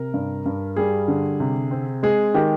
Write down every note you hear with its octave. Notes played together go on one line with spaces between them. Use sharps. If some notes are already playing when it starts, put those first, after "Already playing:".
Already playing: C3 A#4
G2
G2
G3 G#4
D3
C3
C4
G#3 G#4
D#3 G4